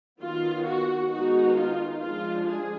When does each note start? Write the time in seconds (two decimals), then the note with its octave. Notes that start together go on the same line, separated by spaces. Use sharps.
0.22 D#3 F#3 B3 F4
0.67 F#4
1.12 D#3 G#3 B3 D#4 F#4
1.57 F4
2.02 F3 G#3 D4 F4
2.48 G#4